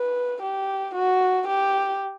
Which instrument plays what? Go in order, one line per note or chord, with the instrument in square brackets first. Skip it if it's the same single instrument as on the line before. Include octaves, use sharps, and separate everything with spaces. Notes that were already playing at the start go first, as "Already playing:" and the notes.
Already playing: [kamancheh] B4
G4
F#4
G4